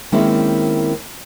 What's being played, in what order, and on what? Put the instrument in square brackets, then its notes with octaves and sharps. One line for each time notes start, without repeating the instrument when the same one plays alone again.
[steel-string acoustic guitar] D#3 G#3 A#3 C4 C#4 E4